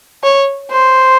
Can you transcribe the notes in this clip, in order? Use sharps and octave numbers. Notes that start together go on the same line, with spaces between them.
C#5
C5